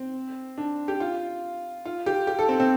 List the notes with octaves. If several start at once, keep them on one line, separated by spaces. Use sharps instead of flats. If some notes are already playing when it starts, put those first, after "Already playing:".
Already playing: C4
D4
G4
F4
F4
G4
G4
A4
C4
C4